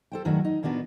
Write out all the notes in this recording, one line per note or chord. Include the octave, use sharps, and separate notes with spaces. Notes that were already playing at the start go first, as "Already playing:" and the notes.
A4 C5 G5
G2 D#3 F#3 A3 F#4
D#4
A#2 A#3 B3 D4 F#4 B4